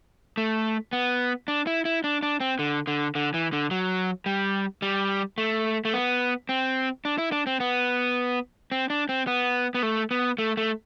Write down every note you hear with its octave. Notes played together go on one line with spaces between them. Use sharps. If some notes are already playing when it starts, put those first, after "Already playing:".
A3
B3
D4
E4
E4
D4
D4
C4
D3
D3
D3
E3
D3
F#3
G3
G3
A3
A3
B3
C4
D4
E4
D4
C4
B3
C4
D4
C4
B3
B3
A3
B3
A3
A3